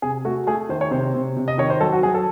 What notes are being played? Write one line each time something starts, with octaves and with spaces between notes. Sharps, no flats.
C3 G#4
A3 F#4
A3 G#4
D#3 C5
C#5
C3 C5
C3
C3
D#5
D#3 C#5
C5
F#3 A4
F#4
F#3 G#4
A4